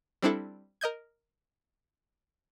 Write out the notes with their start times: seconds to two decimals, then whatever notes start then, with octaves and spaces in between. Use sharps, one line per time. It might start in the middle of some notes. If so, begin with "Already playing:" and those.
0.22 G3 C4 D4 E4 A4
0.81 A#4 D#5 G6 G#6